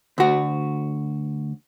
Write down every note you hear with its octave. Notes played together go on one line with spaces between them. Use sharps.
D2 F#4